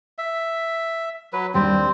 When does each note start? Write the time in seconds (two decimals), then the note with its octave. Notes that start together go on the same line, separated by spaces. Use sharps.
0.18 E5
1.33 F#3 B4
1.54 D#2 G3 C4 D4